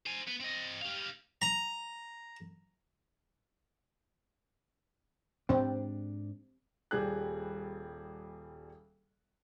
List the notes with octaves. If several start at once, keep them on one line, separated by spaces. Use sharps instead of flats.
C5 G#5
B3
C4 D#5
G4 F5
A#5
G#2 C4 D4
D#1 G3 G#4 F#6